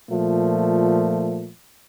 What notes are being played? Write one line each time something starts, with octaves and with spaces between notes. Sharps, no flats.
A#2 F3 A3